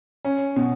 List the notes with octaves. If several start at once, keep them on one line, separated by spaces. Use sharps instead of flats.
C#4
B2